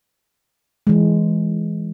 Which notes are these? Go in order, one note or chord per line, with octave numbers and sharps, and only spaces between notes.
E3 G#3